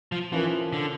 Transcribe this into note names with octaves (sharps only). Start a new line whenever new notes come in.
F3
E3 F3 C#4 F4 A#4
D3